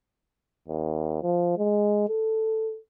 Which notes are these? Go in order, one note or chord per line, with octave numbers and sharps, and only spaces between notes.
D#2
F3
G#3
A4